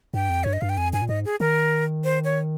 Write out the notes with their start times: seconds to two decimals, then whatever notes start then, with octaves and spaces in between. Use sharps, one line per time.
0.14 G2 G5
0.29 F2
0.44 G2 C#5
0.53 D#5
0.61 G2 F5
0.69 G5
0.77 F2 G#5
0.93 G2 G#5
1.02 A#2
1.08 G#2 D#5
1.25 G#4
1.40 D#3 A#4
2.04 C5
2.24 C#5